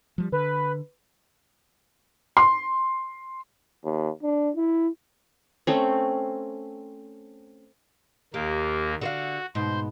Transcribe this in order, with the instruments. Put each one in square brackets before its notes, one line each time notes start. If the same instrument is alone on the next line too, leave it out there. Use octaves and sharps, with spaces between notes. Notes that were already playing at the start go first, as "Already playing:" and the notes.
[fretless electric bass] F3 G3
[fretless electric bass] D3 [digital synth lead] B4
[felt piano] C6
[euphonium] D#2
D4
E4
[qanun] A3 C4 C#4
[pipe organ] D#2 A#3 [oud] G4
[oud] D3 C4 F5 [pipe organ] F#4
[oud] G#2 B2 [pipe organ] C5